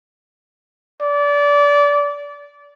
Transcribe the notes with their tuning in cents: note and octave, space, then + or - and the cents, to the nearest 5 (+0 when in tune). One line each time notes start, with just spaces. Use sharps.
D5 -25